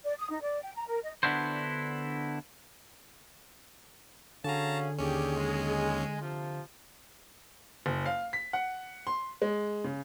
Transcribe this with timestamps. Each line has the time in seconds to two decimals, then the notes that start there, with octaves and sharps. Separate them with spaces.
0.04 D5
0.18 D#6
0.30 D#4
0.41 D5
0.62 G5
0.75 A#5
0.87 A#4
1.03 D#5
1.23 D3 B3 D4 E4 F#4 C5
4.44 D3 C#4 F#4 G#4 F5 A5 A#5
4.98 D#2 C#4 D4 G4 G#4
5.36 G#3
6.21 C3 F3
7.86 F#1
8.05 F5
8.33 B6
8.53 F#5
9.07 C6
9.42 G#3
9.84 C#3